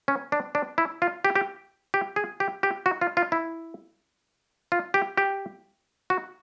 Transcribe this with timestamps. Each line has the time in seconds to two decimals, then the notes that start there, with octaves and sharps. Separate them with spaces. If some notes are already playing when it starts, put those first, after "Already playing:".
0.08 C#4
0.32 D4
0.55 D4
0.78 E4
1.02 F4
1.25 G4
1.35 G4
1.94 G4
2.16 G#4
2.40 G4
2.63 G4
2.86 F#4
3.01 F4
3.17 F4
3.32 E4
4.72 F4
4.94 G4
5.17 G4
6.10 F#4